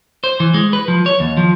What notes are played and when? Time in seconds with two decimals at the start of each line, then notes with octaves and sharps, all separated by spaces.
0.24 C5
0.40 E3
0.54 G#3
0.73 B4
0.88 F3
1.06 C#5
1.20 D#2
1.37 F3